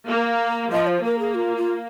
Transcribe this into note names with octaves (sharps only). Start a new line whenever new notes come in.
A#3
F3 D#5
C5
A#3 A#4
G#4
F4
F4